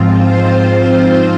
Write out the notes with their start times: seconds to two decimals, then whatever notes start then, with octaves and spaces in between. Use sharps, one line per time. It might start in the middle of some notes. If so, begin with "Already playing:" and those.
Already playing: G#2 F3 C4 F4
0.18 C5
0.74 C5